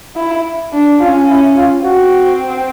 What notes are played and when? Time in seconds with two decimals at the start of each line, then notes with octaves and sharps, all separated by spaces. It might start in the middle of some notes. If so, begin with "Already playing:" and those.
0.16 E4
0.73 D4
1.00 C#4 F4
1.29 E4
1.57 F4
1.84 C4 F#4